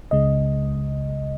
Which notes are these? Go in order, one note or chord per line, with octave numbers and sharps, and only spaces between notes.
C#2 C#3 G#3 D#5